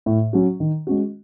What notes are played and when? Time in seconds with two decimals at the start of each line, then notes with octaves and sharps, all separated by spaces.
0.06 A2
0.33 F#3 C#4 F#4
0.60 D#3
0.87 G#3 C#4 F#4